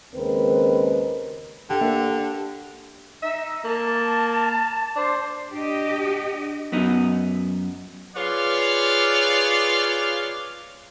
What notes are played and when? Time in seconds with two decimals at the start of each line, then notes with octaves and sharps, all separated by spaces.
0.14 D#2 C#3 G#3 C4 A#4 B4
1.70 D3 G4
1.81 A#3 D4 E5
3.22 D#4 E5
3.65 A#3 A5
4.96 D4 C5
5.52 D4 G4 D#5
6.72 F#2 B3 D#4
8.16 F4 G#4 B4 C#5 D5 F5